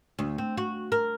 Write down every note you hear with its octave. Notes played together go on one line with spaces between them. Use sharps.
D2
C4
F#4
A#4